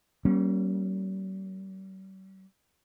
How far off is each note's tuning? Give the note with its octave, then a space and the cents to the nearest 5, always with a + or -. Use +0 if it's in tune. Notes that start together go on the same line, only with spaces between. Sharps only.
G3 -45 A#3 +10 C#4 -15